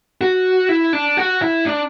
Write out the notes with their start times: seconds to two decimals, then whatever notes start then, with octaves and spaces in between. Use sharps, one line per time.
0.21 F#4
0.69 E4
0.93 D4
1.17 F#4
1.42 E4
1.66 D4